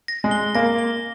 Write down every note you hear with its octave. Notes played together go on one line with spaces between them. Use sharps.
A#6
G#3
G7
A#3 A#6
G7